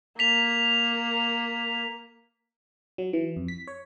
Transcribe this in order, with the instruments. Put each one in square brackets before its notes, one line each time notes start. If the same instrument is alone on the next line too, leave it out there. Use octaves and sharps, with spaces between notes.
[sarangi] A#3 [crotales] B6 F7
[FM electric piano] F#3
E3
F2
B6
C#5